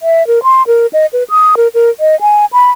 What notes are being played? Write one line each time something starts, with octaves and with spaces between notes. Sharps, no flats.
E5
A#4
C6
A#4
D#5
B4
D#6
A#4
A#4
D#5
G#5
B5